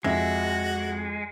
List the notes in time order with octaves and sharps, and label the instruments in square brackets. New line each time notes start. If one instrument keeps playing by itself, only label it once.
[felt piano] F2 [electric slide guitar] G#3 [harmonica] F#4 [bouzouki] E5